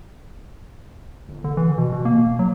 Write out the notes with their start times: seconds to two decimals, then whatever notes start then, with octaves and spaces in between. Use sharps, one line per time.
1.29 G1
1.44 D3
1.57 E3
1.78 B2
1.92 B2
2.05 A#3
2.24 E1
2.39 F#3